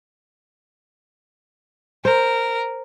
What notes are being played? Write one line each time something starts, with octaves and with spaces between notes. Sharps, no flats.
A#4 C5